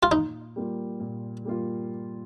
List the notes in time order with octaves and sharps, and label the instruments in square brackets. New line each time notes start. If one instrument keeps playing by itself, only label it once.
[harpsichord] F4
[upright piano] A#2 [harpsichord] D#4
[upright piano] G3 A#3 F4
A#2
G3 A#3 F4